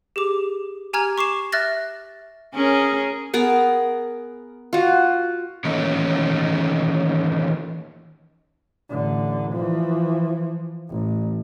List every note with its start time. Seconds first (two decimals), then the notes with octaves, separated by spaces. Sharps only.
0.16 G4 G#4 D6
0.93 G4 G#5 A#5 F6 G#6
1.18 C#6 D6 C7 E7
1.52 E5 F6 F#6 A6 A#6
2.54 C#4 G#4 A#4
3.34 B3 G#4 A#4
4.73 F4 F#4
5.65 D#3 E3 A3 A#3 C#4 D#4
8.89 A1 D3
9.52 E3 F3
10.89 A1